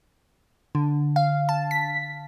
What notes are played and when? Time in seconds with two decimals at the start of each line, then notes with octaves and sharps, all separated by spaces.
0.75 D3
1.16 F5
1.49 A5
1.71 B6